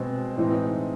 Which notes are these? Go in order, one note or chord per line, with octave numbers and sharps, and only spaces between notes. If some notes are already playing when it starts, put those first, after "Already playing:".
Already playing: B2 G#3 C4
A2 E3 G#3 C4 D#4